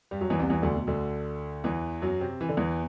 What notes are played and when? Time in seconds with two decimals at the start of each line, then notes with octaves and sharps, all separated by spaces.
0.11 G2 G3
0.21 F#2 F#3
0.30 E2 E3
0.39 C2 C3
0.50 E2 E3
0.62 D2 D3
0.75 B2
0.87 D2 D3
1.64 E2 E3
2.02 F#2 F#3
2.21 C3 C4
2.41 E3
2.49 D3
2.57 E2 E3